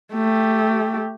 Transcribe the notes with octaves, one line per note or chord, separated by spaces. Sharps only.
A3 G4